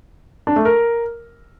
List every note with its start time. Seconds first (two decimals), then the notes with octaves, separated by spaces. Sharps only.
0.47 D4
0.56 A3
0.65 A#4